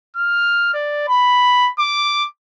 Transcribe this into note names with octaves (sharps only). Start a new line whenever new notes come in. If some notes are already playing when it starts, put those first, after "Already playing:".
F6
D5
B5
D6